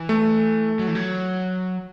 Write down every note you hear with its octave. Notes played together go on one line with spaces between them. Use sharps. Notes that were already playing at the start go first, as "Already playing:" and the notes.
Already playing: E3
A3
F#3
E3
F#3